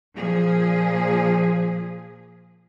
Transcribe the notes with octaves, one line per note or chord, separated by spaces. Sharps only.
A#2 F3 G#4